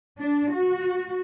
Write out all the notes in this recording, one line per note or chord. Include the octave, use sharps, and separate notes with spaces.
D4
F#4